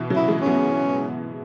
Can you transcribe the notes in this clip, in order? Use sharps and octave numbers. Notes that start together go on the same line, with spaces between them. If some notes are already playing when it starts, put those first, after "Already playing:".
Already playing: B2 E3
C#3 F#3
E4
E3 G#3
C#4
F#3 B3